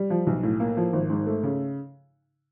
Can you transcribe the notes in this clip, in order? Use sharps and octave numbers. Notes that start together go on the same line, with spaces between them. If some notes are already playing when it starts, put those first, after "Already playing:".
Already playing: G3
F3
B1
A2
A#3
F3
G#1
G#2
A3
C#3